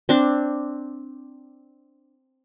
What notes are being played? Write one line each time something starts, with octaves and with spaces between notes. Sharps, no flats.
C4 D4